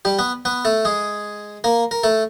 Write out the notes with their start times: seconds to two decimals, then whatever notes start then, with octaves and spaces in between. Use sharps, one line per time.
0.05 G3 G4
0.19 B3 B4
0.45 B3 B4
0.65 A3 A4
0.85 G#3 G#4
1.64 A#3 A#4
1.91 A#4
2.03 A3 A4